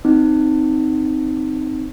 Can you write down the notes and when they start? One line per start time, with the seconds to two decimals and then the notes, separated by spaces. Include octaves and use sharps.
0.05 C4 D#4